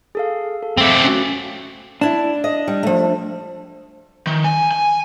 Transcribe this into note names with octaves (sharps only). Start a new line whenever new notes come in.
G#4 A4 F5
A4
A3 C4 D6 E6
C#4 F#4
D4 E4 A5
D#5
G3
F3 A3
D#3
G#5
G#5